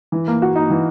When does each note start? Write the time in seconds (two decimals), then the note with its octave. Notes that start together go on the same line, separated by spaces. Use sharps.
0.12 E3
0.28 A#3
0.42 F#4
0.56 D#4
0.70 E3